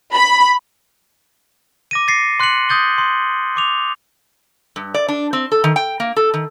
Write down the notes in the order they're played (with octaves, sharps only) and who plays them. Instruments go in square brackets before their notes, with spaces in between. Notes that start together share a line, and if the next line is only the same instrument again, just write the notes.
[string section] B5
[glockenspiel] D6 A#6 D#7
A6 A#6 C7 C#7
C6 F#6 B6 C#7 F#7
D#6 G6 A6 G7
C6
C6 D6 F7
[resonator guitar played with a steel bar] G2
D5
D4
C4
A4
D#3
G5
A#3
A4
D#3